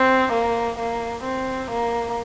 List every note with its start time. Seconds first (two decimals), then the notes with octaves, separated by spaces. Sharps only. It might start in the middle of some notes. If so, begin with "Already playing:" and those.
Already playing: C4
0.32 A#3
0.79 A#3
1.24 C4
1.71 A#3